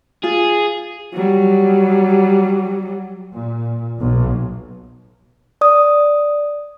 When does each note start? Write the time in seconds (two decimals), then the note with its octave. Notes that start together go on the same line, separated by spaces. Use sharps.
0.24 F4 G#4
1.14 F#3 G3
3.33 A#2
4.01 B1
5.61 D5 D#6